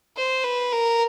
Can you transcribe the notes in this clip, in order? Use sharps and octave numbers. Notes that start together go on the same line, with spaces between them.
C5
B4
A#4